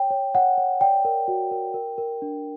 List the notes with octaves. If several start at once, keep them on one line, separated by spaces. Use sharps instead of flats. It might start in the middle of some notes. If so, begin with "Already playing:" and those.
Already playing: C#5 G5
C#5
C#5 F#5
C#5
D5 G5
A#4
F#4
A#4
A#4
A#4
D4